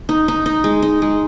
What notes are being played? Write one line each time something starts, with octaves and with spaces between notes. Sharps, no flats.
D#4
D#4
D#4
G#3
D#4
G#3